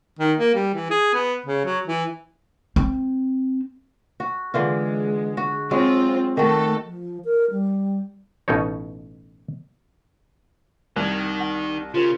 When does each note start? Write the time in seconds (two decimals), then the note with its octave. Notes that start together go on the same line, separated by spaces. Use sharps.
0.19 D#3
0.37 A#3
0.55 G3
0.74 E3
0.90 G#4
1.14 B3
1.46 C#3
1.65 F#3
1.87 E3
2.76 C4
4.20 F#4
4.54 D3 E3 G#3 F4
5.37 F#4
5.71 F#3 G#3 C4 F4
6.37 D#3 A3 F#4 A4
6.86 F3
7.25 A#4
7.51 G3
8.48 A1 B2 A3 D#4 C#5
10.96 C2 D#3 F#6 G#6
11.40 F#5
11.94 C#3 F4 G4 A#4 C5